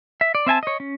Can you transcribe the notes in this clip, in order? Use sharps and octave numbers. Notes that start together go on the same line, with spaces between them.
E5
D5
C4 E5 G#5 A5
C#5 D#5
C#4